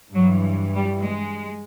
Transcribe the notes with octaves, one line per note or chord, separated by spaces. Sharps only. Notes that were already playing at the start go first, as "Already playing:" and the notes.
G2 E3 F#3
G3
G#3